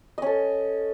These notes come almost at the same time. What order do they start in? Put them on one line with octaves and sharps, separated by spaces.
D#5 C#4 A4